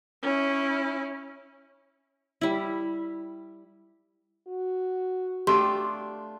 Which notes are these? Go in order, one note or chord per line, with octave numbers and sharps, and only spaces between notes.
C#4 E4
G3 E4
F#4
A3 D4 F4 G4 C6